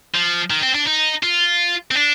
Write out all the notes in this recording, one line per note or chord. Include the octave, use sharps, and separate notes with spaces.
F3
D#3
C4
D4
D#4
F4
C4
D4